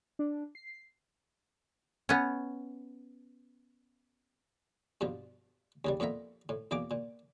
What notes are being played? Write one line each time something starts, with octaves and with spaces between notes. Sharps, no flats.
D4
C7
B3 C#4
G2 B2 F3
D#2 C#3 G3
F2 A#2 B3 E5 A#5
A2
E2 B2 E3 A#3 D6
A#2